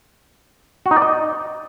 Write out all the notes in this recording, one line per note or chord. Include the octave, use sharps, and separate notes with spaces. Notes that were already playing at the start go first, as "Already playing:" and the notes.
F#4
D#4
D5
D#5